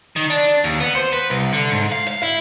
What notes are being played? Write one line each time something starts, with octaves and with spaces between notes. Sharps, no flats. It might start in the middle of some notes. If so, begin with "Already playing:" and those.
D#3
D4
D#2
B3
C5
B4
C2
D3
G#2
F5
F5
E4